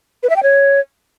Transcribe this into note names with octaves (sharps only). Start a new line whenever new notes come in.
B4
E5
G5
C#5